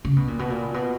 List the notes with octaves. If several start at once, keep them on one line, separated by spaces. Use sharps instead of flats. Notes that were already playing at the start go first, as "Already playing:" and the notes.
C#3
B2
A#2
B2
A#2
B2